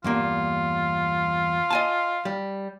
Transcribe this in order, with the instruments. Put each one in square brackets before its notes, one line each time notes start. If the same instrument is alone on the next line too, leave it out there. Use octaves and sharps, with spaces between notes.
[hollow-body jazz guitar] E2 G2 A#3 [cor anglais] F4
[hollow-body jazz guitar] D#5 G#5 A5
G3